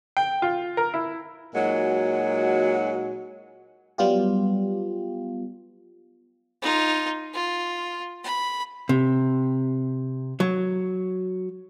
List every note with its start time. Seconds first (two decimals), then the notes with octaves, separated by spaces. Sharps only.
0.17 G5
0.42 F4
0.77 A#4
0.94 E4
1.55 A#2 F#3 G#3 D#4 F#4
3.98 F#3 G3 B3 F4 G4
6.62 D#4 F4
7.34 F4
8.24 B5
8.89 C3
10.40 F#3